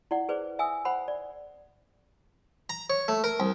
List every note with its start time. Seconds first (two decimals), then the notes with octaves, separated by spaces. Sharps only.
0.11 E4 D5 F#5
0.29 G#4 B4 C5 D5
0.59 E5 G#5 D#6 E6
0.85 C5 F#5 B5
1.08 D5
2.70 A#5
2.90 C#5
3.08 A3
3.24 A#4
3.40 C2